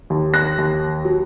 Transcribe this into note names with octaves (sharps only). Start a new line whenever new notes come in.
D#2
F#6 A#6
D#2
F#3